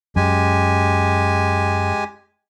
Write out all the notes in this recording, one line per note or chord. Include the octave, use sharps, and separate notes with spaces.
F#2 G#3 G4 G#5